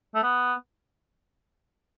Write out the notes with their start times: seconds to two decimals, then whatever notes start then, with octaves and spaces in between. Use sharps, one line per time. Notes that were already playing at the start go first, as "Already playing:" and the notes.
0.14 A3
0.23 B3